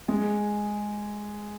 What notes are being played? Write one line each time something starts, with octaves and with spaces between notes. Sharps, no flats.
G#3 G#4